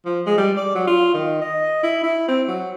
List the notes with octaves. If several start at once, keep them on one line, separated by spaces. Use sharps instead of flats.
F3
G#3
G3
D5
F#3
F4
D#3
D#5
E4
E4
C4
F#3